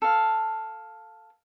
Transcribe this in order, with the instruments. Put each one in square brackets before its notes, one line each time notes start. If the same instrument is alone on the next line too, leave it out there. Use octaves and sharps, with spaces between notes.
[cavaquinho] A4 F5